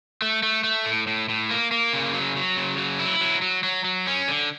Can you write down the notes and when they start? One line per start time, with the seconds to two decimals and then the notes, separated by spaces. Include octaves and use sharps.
0.22 A3
0.43 A3
0.64 A3
0.86 A2
1.07 A2
1.29 A2
1.51 A#3
1.71 A#3
1.93 C#3
2.14 F#3
2.36 F#3
2.57 C#3
2.78 F#3
3.00 E4
3.21 F#3
3.42 F#3
3.64 F#3
3.85 F#3
4.07 C#4
4.28 D3